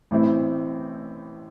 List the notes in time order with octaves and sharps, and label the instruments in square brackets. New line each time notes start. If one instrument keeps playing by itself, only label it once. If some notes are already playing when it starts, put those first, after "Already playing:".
[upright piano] A1 A2 E3 C4 E4